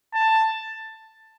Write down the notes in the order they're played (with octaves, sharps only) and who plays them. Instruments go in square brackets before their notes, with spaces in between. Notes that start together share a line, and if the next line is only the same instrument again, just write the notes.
[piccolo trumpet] A5